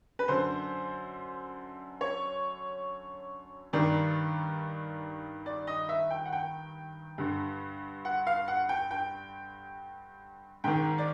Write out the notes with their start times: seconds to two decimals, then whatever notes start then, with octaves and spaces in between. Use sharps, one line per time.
0.19 B4
0.28 F#2 D3 C5
2.01 C#5
3.73 G2 D#3 D5
5.46 D5
5.67 D#5
5.89 E5
6.11 G5
6.26 F#5
6.33 G5
7.18 G2 D3
8.05 F#5
8.27 F5
8.48 F#5
8.69 G5
8.91 G5
10.64 G#2 D#3 G5
10.98 D5